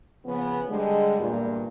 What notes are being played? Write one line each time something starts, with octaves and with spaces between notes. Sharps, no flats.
C#3 F3 B3
D3 G3 G#3
E2 G2 A#2